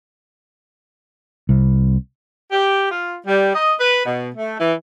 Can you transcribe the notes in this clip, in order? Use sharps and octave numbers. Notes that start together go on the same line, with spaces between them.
C2
G4
F4
G3
D#5
B4
B2
A3
E3